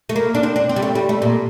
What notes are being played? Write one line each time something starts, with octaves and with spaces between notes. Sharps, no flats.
A3
A#3
D4
C4
D4
C4
G3
A3
G3
A3
A#2